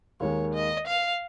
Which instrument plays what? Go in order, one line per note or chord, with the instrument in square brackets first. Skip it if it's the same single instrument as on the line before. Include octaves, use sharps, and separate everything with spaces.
[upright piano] D#2 D#3 G#3 [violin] C#5
[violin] D#5
F5